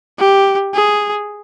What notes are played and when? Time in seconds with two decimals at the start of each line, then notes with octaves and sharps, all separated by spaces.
0.18 G4
0.74 G#4